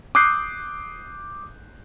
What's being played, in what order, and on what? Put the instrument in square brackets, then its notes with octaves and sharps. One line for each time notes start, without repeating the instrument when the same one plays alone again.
[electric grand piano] D6 D#6 F#6 G6 C7